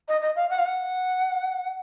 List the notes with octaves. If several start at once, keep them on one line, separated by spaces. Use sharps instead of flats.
D#5
D#5
F5
F#5
F5
F#5